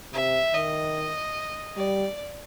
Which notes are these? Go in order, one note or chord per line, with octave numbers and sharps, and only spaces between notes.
C3 E5
D#3 D#5
G3 D5